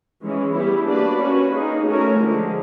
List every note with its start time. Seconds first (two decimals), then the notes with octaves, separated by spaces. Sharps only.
0.22 E3 G#3 C#4
0.54 E3 G3 B3 E4 G4
0.88 A#3 D4 F#4 B4 D5
1.20 C#4 F#4 B4
1.53 A#3 D#4 G#4
1.86 A3 C#4 F#4 A#4
2.19 D3 F3 G#3